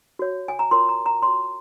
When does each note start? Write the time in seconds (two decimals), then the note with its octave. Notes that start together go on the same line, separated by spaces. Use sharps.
0.19 F#4 C#5
0.48 G#5
0.59 A#5
0.71 F4 A#4 C#5 C6
0.89 A#5
1.06 A#5
1.22 F#4 C#5 C6